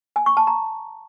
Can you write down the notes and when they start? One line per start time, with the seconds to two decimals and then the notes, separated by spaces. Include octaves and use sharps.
0.16 G#5
0.26 C#6
0.37 A5
0.47 A#5